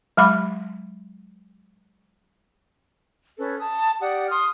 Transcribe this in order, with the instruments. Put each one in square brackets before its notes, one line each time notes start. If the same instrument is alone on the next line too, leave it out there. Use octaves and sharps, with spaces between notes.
[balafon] F#3 G#3 B5 D6
[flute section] C#4 A4 B4 C#5
A5 D#6
G4 D5 F#5 D#6
C6 D#6 F6